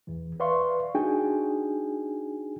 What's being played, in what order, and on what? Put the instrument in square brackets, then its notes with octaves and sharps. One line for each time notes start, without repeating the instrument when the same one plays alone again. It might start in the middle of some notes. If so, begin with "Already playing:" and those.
[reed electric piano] E2 E3
B4 D5 E5 F5 C6 C#6
D4 D#4 F#4 G#4 G5 G#5